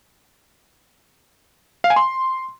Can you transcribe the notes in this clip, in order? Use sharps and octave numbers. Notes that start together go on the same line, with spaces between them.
F5
G#5
C6